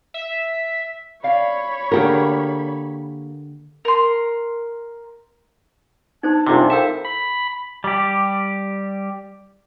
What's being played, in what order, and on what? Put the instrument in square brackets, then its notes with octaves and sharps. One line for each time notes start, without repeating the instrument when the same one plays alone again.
[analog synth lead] E5
[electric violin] C#5 B5 [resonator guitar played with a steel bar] D5 F5
[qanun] D3 G4 G#4 [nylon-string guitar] A#3 A#4
[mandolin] A#4 C6
[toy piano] D#4 C5 [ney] A5
[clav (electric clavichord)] C2 F#2 C3 [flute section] D4 F4 G#4
[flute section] E4 A4 A#4 [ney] C5 [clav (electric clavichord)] E5 [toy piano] F5 G5 E6
[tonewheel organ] B5
[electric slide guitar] G3 G4